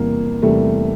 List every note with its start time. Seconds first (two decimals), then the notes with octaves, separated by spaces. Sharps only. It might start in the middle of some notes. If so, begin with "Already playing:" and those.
Already playing: E2 C3 G3 A#3
0.42 E2 C3 G3 A3